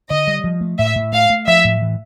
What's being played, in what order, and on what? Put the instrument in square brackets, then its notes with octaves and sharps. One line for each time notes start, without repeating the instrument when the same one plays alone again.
[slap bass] D3 [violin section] D#5
[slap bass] G3
F3
A3
[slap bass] A2 [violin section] E5
[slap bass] A2
[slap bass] A3 [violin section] F5
[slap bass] A3
[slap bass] F3 [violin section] E5
[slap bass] A2
E3